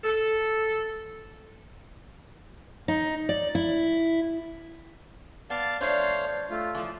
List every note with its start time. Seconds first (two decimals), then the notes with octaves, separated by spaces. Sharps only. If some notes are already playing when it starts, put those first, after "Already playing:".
0.04 A4
2.88 D#4
3.29 D5
3.55 E4
5.50 B3 D5 F5 A5
5.81 F3 A3 D4 C5 C#5 F5
6.50 A3 F4
6.75 E3 F3